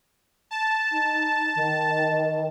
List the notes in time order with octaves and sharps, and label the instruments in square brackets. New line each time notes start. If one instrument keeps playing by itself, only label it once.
[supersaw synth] A5
[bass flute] D#4
D#3